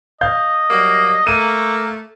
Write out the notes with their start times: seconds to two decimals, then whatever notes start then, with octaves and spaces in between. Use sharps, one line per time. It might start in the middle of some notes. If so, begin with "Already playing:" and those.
0.21 D#5 F5 G6
0.70 F#3 G3 A#3
1.27 A3 A#3 D#7